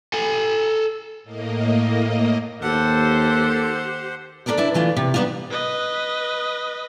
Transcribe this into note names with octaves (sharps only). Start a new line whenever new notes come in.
A4 G#5
A2 A#3 D#5
D#2 G4 A4 C5 F#5
D4 E4 A4 A#4 D5
D4 E4 B4
D3 E3 A3 F4
C3
G3 B3 D4 D#4 F4
B4 D#5